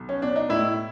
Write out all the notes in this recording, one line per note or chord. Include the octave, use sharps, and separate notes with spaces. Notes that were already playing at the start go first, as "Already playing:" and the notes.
Already playing: B1
C#4
B2 D4
D#4
A2 E4